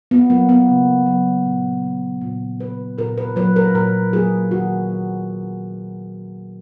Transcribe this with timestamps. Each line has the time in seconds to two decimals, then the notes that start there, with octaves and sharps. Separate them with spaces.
0.11 B3
0.30 F#3 A#3
0.49 B3
0.69 C#3
1.06 F#3 A#3
1.46 A#2
1.84 A#3
2.22 A#2
2.60 A#3 B4
2.98 A#2 A#4
3.18 B4
3.36 F#3 A#3 B4
3.56 A#4
3.74 A#2 A#4
4.13 F#3 A#3 G#4
4.51 D#3 F#4
4.90 A#3